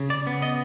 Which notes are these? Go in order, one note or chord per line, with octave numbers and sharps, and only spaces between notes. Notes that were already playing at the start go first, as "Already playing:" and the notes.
Already playing: C#3
D5
B3
D#5